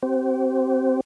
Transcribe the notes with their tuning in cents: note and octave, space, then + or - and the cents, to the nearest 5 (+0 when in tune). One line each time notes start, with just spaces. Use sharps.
C4 +0 G4 -40